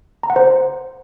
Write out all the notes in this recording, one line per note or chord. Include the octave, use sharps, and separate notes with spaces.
A#5
F#5
C5